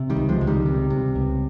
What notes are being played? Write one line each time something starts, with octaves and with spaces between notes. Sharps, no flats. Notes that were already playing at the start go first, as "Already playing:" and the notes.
Already playing: C3
D#3 G3
C#2
F3 G#3
C#2
D#3 G3
C3
C3
C#2